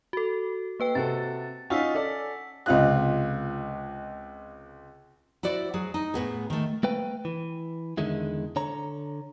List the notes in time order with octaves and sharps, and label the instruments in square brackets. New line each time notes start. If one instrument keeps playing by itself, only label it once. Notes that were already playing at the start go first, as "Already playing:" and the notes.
[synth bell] F#4 A4
A#3 B4 G5
[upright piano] C3 F#4 A4 [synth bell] A6
[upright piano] C#4 D#4 F4 [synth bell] F#5 E6 B6
[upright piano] C#4 A4 D5
[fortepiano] C#2 C3 F4 D#5 F#6
[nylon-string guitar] E4 F#4 C5 D5
F#3 G#4
D#4
A2 B3 G#4
D#3 A3
[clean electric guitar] A3 A#3 B4 G5
E3
E2 D3 D#3 G#3 E4
D3 C#5 A#5